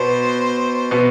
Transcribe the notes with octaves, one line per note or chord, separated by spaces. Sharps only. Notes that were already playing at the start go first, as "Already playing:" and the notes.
Already playing: B2 B3 C5
B2 B3